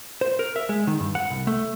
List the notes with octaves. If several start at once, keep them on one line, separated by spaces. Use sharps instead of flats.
C5
A#4
E5
G#3
D#3
G2
F#5
C2
A3